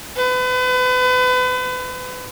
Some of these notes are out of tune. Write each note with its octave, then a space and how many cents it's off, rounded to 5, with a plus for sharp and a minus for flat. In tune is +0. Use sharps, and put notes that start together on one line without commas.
B4 +35